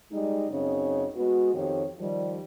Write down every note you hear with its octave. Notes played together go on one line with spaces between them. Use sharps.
G3 G#3 D#4
F#2 C#3 C4 D#4 C#5
G#3 B3 F#4
F2 D#3 G4 C#5
D#3 F3 G3